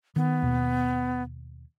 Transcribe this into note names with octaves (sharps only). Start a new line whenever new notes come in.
D#3 B3
D#2 B2